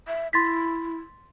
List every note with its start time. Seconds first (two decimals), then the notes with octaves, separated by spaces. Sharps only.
0.08 E5
0.33 E4 C6 A6 B6